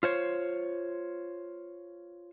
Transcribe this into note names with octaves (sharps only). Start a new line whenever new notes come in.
F4 C5 C#5